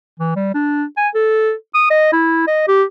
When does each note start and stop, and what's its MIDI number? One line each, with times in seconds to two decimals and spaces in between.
0.20 0.34 52
0.36 0.50 55
0.54 0.84 62
0.97 1.08 80
1.15 1.53 69
1.74 1.89 87
1.91 2.10 75
2.13 2.45 64
2.47 2.68 75
2.68 2.84 67